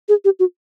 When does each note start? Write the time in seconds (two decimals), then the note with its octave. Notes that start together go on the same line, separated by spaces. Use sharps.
0.09 G#4
0.25 G4
0.39 F#4